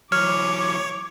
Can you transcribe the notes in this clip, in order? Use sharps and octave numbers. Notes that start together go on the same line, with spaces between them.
E3 F#3 C#5 D6 F6